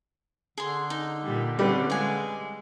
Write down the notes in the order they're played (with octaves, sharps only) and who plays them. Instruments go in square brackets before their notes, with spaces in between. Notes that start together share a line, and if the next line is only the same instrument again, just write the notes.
[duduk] D3 [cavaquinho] G#4 C6
[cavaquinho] D#4
[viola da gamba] A#2 G3
[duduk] D3 [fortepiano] G3 G4 B4 [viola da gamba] C4 C#4 [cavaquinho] E4
[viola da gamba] G#3 [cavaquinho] F5 G#5